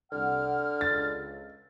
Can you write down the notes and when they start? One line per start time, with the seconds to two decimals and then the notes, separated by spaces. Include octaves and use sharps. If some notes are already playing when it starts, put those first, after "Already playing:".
0.12 C2 D3 F#5 F6
0.81 C#2 A6